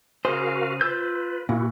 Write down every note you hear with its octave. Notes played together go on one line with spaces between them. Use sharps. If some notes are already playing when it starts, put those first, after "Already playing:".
C#3 F#4 G#4 A#4 C5 F5
F4 B4 E6 G6
A#2 E4 F#4